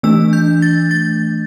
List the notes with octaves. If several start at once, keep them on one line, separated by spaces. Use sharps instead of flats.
E3 A3 D4 E6
G6
A6
A6